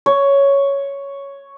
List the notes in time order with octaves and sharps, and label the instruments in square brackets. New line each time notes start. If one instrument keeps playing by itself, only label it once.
[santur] C#5